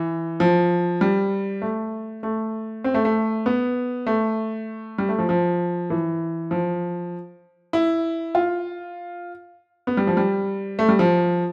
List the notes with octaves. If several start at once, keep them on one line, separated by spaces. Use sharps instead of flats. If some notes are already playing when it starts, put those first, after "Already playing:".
Already playing: E3
F3
G3
A3
A3
C4
A3
A3
B3
A3
G3
A3
F3
F3
E3
F3
E4
F4
B3
G3
F3
G3
A3
G3
F3